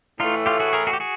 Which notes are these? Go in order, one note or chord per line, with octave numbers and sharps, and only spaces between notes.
A2 E3 A3 D#4 F4
F4 G4
F#4 G#4
G#4 A#4
F#4 G#4
G4
F#4 G#4